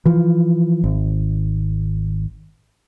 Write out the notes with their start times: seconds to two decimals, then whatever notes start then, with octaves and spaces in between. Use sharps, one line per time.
0.05 E3 F3
0.84 G#1